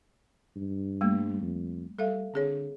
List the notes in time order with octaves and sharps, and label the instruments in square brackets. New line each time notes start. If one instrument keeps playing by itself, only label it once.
[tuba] G2
[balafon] G3 A3 A#3
[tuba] F2
[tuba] G3 [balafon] A4 E5 F5
[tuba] D3 [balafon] C4 G#4 C#5